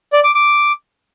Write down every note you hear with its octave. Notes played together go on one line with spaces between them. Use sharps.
D5
D6
D6